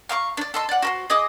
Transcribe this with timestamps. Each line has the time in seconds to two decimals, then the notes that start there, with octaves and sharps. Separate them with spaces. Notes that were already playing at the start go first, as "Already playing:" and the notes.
0.09 F5 A#5 C6 C#6
0.37 D4 D5
0.54 A4 D#5 C6
0.69 D5 F#5
0.82 F#4 A#4 C5
1.10 G#4 D#5 D6 D#6